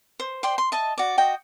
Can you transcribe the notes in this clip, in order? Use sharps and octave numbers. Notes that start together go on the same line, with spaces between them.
C5
C5 D5 G5 C6
C6
D#5 E5 A5
F#4 D5
F#4 D#5 G5